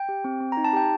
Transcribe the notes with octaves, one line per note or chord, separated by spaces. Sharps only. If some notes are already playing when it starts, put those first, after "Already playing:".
Already playing: G5
G4
C4
C4
D#4 A#5
A5
G4 G5